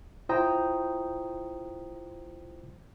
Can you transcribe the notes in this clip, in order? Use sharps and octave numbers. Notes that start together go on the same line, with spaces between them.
E4 F4 C5 G5 A#5 D#6